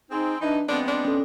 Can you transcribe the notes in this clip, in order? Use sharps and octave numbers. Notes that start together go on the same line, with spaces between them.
C4 D#4 G#4
E3 D4 D#4
F3 G#3 B3 C4 D4
D4
C#4 A4